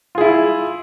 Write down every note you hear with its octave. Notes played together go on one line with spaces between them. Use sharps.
E4 F4 G#4